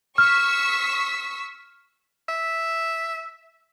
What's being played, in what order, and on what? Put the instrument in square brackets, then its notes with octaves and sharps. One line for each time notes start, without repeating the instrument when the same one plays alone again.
[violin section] C#6 E6 B6 [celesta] F6
[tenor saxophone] E5